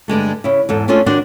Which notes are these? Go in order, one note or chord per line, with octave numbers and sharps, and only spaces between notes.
G2 D3 G#3 A3
C#3 E4
E2 G#2 A4
A3 C#4 D4 F4 G#4 A4
D#3 D4 F#4 C5 D5